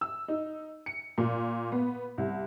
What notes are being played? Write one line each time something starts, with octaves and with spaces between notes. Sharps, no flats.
E6
D#4
C#7
A#2
B3
C2